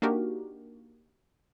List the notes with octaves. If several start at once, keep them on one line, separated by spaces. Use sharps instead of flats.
A#3 D4 D#4 F#4 G4 A#4